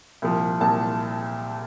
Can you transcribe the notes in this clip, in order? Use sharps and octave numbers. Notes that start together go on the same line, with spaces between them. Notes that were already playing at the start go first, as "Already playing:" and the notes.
C2 A#2 F3
C2 A#2 F3 A5